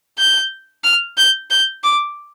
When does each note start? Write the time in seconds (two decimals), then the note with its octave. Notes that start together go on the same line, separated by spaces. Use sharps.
0.18 G6
0.84 F6
1.17 G6
1.50 G6
1.83 D6